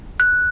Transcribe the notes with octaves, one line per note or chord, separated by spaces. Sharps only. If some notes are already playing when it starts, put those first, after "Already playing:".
F#6